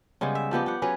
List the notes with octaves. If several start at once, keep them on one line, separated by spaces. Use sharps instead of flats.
C#3 G3 G#3 B3
E5
F3 G3 B3 G4
G4 F#5
F#3 C#4 G#4 B4